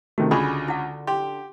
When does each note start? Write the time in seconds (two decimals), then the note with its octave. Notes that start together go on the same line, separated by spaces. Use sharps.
0.18 C3 D#3 A3 C#4 F#4
0.31 C#2 D3 F4 G#4 B5 C#6
0.68 E4 F#5
1.07 G4 C6